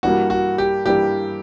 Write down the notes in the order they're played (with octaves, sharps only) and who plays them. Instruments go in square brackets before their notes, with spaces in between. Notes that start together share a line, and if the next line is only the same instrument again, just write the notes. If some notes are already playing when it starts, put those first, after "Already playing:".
[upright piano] G2 E3 G3 A#3 [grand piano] F#4
[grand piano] F#4
G4
[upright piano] G2 E3 G3 A#3 [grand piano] G4